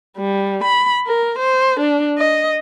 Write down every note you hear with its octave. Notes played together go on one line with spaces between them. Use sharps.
G3
B5
A#4
C5
D4
D#5